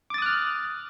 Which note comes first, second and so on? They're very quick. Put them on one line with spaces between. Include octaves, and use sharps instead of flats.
D6 A6 D#6 F#6 F6